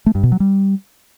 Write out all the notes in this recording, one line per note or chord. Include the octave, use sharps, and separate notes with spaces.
A3
G2
B2
F#3
G3